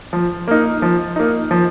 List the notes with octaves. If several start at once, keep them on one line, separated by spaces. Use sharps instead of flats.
F3
A#3 D#4
F3
A#3 D#4
F3